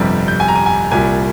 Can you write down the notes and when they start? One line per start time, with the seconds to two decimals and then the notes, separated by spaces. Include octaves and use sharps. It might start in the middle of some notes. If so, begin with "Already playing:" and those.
Already playing: G1 F2 C3 G3
0.28 G6
0.40 G#5
0.48 A#5
0.55 G#5
0.66 G#5
0.91 C2 A#2 G3 G#5